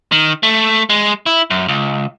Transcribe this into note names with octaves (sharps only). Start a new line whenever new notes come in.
D#3
A3
G#3
E4
F#2
C#2